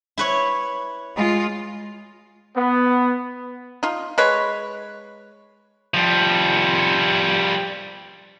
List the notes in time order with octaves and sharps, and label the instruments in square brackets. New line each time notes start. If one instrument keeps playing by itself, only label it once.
[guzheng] E4 B4 C#5
[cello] G#3 F4
[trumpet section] B3
[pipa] D#4 F4
G#3 B4 C#5
[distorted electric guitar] F3 G3